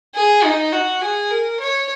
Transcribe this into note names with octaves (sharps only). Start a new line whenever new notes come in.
G#4
D#4
F#4
G#4
A#4
C#5